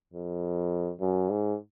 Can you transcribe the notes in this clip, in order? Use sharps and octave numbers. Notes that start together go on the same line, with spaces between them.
F2
F#2
G#2